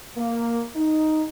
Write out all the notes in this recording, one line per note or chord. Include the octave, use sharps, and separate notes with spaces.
A#3
D#4